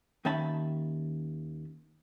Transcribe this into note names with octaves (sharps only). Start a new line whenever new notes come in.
D#2 D#3 C#4 E5 A5 B5